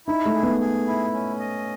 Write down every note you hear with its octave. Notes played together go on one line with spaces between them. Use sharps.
D#4 E4
A3
G#4
B3
G#4
E4
C#4
D#5